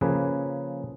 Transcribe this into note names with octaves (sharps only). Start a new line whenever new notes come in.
C#3 F3 A#3 G#4 B4